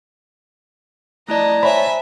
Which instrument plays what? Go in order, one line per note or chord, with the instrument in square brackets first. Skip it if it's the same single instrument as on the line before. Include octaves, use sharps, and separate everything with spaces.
[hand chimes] A3 E4 D5 [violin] D#5 [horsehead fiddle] A5 A#5
[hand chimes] C5 [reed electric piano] C#5 B5 [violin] E5 G#5